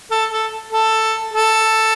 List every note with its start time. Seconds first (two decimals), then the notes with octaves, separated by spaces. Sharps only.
0.11 A4
0.32 A4
0.72 A4
1.34 A4